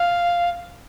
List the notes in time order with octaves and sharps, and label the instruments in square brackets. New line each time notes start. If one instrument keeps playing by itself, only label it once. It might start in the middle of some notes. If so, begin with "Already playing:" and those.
Already playing: [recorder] F5